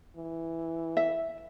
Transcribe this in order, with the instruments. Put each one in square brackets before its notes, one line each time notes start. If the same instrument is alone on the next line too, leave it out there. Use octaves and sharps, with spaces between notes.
[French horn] E3
[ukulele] E5